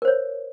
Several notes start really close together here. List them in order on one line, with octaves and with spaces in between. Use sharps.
A#4 C5 C#5